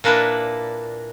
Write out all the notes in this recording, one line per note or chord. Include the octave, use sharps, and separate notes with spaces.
A#2 A#3 D4 E4 B4